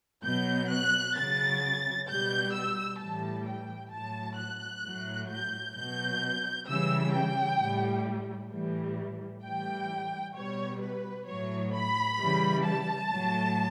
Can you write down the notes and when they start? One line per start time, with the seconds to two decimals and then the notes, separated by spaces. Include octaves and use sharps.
0.24 B2 F#3 G6
0.70 F#6
1.16 C#3 F#3 A6
2.08 B2 G3 G6
2.53 E6
2.99 A2 E3 G3 A5
3.46 G5
3.91 A2 F#3 A5
4.37 F#6
4.83 A2 F#3
5.29 G6
5.75 B2 F#3 G6
6.67 C#3 E3 G3 E6
7.13 G5
7.59 A2 G3
8.51 A2 E3 G3
9.43 A2 E3 G3 G5
10.34 B2 G3 C#5
10.81 B4
11.26 A2 F#3 C#5
11.73 B5
12.18 C#3 E3 G3
12.64 A5
13.10 A2 F#3